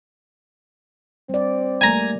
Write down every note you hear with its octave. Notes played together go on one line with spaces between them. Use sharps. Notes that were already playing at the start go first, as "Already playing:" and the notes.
G3 C4 D5
G3 A3 A#3 G#5 A#5